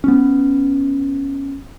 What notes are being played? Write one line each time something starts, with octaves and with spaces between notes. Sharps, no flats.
B3 C#4